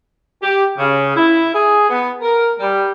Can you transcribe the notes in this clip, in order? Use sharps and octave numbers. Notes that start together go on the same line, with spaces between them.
G4
C#3
E4
G#4
B3
A#4
G3